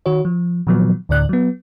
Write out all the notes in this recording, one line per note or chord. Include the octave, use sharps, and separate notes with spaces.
D#3 F#4 C#5
F3
A#2 D#3 F3 F#3 B3
D2 A2 D3 D5 F#6
F#3 B3